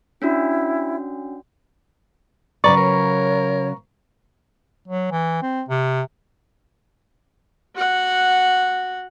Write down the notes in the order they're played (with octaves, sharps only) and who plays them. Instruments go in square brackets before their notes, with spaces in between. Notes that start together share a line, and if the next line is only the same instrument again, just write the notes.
[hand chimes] C#4 D4 F#4 [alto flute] E4
[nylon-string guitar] C#3 F#3 B4 [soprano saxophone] D5 [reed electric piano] A#5 C#6
[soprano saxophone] A#4 [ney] C#5
[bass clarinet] F#3
E3
C4
C3
[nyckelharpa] F#4 F#5